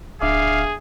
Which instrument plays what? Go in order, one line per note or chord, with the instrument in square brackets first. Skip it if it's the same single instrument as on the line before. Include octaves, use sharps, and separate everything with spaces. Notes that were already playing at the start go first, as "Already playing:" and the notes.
[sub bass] D1 [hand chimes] D4 E5 D6 [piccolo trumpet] G#4 [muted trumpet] F5